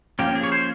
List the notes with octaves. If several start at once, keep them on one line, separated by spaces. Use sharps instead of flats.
F3 A#3 C#4 G4
G#4
C#5
C5